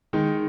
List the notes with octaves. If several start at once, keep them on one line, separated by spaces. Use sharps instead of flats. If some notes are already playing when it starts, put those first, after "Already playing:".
D#3 G#3 D#4